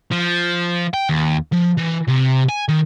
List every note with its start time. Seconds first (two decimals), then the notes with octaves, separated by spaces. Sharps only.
0.11 F3
0.94 G5
1.09 D#2
1.52 F3
1.77 E3
2.08 C3
2.49 G#5
2.68 D#3